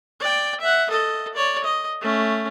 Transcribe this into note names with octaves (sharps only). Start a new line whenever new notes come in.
D5 G5
E5 F#5
A4 D#5
C#5 D5
D#5
A3 C#4